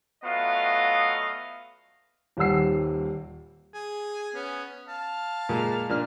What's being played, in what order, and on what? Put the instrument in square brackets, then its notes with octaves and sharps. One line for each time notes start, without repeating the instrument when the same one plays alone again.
[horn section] F#3 A3 B3 F4 D#5 F5
[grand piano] D#1 D#2 G3 F#5 E6 C7
[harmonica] G#4
B3 C#4
F5 A5
[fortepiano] A#2 G#3
A#2 D4 F6